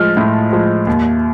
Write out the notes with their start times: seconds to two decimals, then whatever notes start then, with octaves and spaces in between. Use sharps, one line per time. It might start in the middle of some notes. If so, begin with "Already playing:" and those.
Already playing: A2 F3 G#3 F6
0.17 A2
0.53 F3 G#3
0.87 D#2